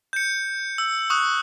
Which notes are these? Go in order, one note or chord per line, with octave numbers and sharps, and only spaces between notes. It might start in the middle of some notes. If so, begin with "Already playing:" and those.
G6 C#7
E6
C#6 D#6 F#6